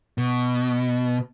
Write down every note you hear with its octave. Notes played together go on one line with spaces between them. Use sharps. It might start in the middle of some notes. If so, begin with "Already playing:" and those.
B2